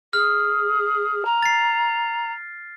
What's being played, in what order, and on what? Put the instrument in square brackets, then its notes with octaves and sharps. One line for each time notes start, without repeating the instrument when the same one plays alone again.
[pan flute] G#4 [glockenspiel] F6
[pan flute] A#5
[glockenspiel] A6 C7